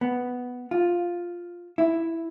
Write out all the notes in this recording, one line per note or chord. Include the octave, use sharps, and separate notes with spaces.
B3
F4
E4